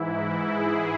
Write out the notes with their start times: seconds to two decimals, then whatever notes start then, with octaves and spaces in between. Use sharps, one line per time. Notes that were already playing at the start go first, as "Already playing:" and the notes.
Already playing: G#2 E3 E4
0.16 E4
0.52 G#4